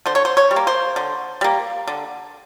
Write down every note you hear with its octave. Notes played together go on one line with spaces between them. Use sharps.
D3 C5
C#5
C5
C#5
G3
A#3
C5
D3
G3 A#3
D3